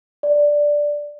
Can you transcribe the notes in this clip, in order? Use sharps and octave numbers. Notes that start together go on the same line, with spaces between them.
D5